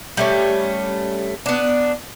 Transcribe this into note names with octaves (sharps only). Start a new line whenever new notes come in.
G3 A3 C#4
B3 D4